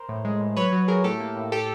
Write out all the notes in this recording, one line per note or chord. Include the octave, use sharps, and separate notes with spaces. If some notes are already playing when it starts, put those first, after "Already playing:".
Already playing: A#4 C5
A2
G#3
A2
F#3 B4 C#5
F#3
F#3 G#4 A#4
A2 G4 A4
A#3
A2
G4 A4